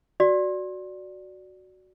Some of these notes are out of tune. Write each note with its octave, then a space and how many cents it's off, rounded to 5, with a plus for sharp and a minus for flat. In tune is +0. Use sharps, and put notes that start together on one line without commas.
F#4 +0 D5 +0